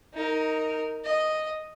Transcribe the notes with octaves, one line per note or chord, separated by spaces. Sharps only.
D#4 A#4
D#5